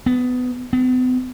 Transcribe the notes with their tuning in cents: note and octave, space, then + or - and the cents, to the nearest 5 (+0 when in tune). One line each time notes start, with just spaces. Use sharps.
B3 +20
B3 +45